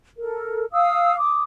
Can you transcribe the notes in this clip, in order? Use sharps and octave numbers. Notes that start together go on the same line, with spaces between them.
A4 A#4
F5 D#6 E6
D6 D#6